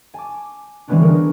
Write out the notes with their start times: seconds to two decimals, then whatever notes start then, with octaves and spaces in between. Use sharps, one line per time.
0.14 G#5 A5 D6
0.88 E3 G3 G#3 B3 C#4 D4
0.99 D3 G#4 A#4